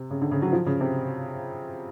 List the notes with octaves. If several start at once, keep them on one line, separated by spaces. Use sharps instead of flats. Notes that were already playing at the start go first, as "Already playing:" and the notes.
Already playing: C3
C#3
D3
C#3
F#3
F3
C#3
C3